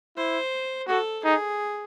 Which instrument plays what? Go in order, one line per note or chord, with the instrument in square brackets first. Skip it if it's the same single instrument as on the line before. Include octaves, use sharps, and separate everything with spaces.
[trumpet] E4 [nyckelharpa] C5
[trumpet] F#4 [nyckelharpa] A4
[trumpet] D#4 [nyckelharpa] G#4